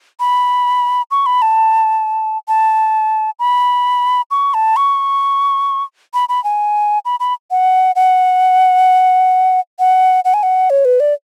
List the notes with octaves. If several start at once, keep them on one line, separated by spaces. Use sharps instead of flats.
B5
C#6
B5
A5
A5
B5
C#6
A5
C#6
B5
B5
G#5
B5
B5
F#5
F#5
F#5
F#5
G#5
F#5
C#5
B4
D5